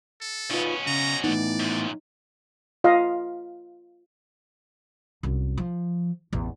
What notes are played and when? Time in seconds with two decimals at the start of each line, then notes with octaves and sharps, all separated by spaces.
0.21 A4
0.51 B2 C#4 D#4 F4 B4
0.86 C#3 A#5
1.24 A2 E3 B3 D#4 D5
1.60 F#2 A#2
2.84 F4 D#5 F5
5.23 C2 F#2
5.58 F3
6.33 A1 E2